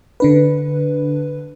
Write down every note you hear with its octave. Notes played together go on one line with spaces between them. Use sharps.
D3 D4 B4